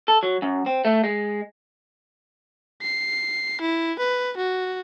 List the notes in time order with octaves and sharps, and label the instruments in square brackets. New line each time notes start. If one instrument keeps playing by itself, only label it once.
[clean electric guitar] A4
F#3
F#2
C4
A3
G#3
[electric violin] C7
E4
B4
F#4